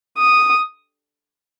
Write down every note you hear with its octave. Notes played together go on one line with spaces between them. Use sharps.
D#6